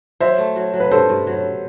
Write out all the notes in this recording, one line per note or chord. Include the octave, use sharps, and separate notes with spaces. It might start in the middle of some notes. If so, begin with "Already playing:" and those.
F#3 C5 E5
A3
F#3
F#3
B4
G2 A4 C5
G2
F#3